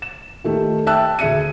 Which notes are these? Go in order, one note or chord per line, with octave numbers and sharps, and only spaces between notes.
E7
D#3 A3 G4
E5 G5 A5 E6 F#6
D2 G#4 E5 C#7 D#7